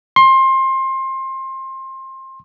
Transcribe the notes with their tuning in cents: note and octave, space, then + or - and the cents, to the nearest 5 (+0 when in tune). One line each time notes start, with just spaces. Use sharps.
C6 +25